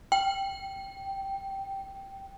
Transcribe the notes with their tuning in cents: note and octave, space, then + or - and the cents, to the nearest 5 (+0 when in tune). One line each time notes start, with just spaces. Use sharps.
G5 -5